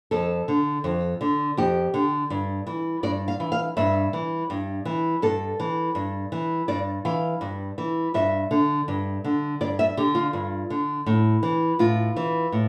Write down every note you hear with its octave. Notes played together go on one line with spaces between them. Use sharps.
F2 A4
D3
F2
D3
F2 G4
D3
G2
E3
G2 D5
F5
E3
F5
G2 E5
E3
G2
E3
G2 A4
E3
G2
E3
G2 D5
E3 F5
G2
E3
G2 E5
D3
G2
D3
G2 D5
E5
D3 G4
F4
G2
D3
A2
E3
A2 F4
E3
A2